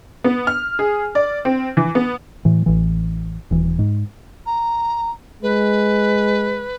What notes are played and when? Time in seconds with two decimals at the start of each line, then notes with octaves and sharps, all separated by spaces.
0.24 B3
0.47 F6
0.79 G#4
1.15 D5
1.45 C4
1.77 E3
1.95 B3
2.45 A2 E3
2.66 A1 E3
3.51 D#1 E3
3.79 G#2
4.46 A#5
5.42 G#3 B4